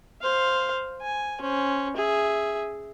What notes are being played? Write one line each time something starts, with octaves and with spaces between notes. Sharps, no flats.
C5 F5
G#5
C#4 C5
G#4 E5